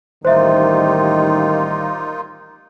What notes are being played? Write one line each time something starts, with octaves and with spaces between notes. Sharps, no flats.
A1 D#3 G3 A#3 D#4 F4 C5 E5